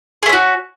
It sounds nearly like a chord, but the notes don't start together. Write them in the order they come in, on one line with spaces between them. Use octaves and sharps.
G#4 A3 C#4 F#4